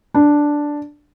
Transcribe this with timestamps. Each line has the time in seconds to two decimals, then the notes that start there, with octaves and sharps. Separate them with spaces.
0.14 D4